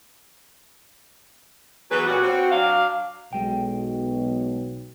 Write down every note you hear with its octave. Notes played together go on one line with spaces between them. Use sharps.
E3 F#3 B3 F#4 G#4 B4
A#2 G3 C#4 F#4
C4 F#4
F#3 D4 F5
B1 B2 G#3 G5